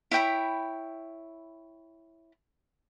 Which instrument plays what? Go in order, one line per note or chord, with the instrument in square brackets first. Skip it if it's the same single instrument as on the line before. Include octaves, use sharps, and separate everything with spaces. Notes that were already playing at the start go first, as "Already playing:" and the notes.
[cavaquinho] E4 C#5 G5 B5